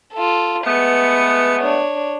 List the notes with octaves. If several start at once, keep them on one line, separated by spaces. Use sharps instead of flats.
F4 A4
G#3 A3 B3 B4 C#7
D4 C#5